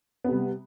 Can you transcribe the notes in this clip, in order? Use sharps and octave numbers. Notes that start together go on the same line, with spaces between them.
C3 G3 B3